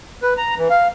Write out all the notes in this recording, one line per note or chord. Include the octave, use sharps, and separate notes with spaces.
B4
A#5
E3
F5